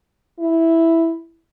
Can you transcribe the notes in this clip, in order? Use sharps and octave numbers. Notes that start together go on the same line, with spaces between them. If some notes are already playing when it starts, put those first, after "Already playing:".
E4